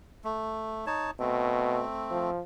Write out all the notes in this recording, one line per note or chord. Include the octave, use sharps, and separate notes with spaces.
A3
D#4 C#5 A5
B2 A3 C4
F3